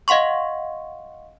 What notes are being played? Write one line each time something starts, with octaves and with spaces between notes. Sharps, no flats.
D#5 F5 F#5 C6 C#6